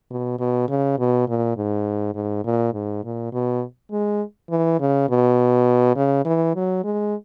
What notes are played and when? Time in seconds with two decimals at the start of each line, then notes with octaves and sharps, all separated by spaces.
0.11 B2
0.39 B2
0.68 C#3
0.99 B2
1.28 A#2
1.57 G#2
2.15 G#2
2.44 A#2
2.73 G#2
3.04 A#2
3.33 B2
3.91 G#3
4.50 E3
4.80 C#3
5.09 B2
5.96 C#3
6.25 E3
6.55 F#3
6.84 G#3